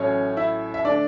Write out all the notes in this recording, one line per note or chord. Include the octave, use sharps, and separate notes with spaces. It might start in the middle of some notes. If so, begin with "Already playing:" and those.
Already playing: A1 A2 F#3 A3 C#4 C#5
E4 E5
E5
D3 A3 D4 D5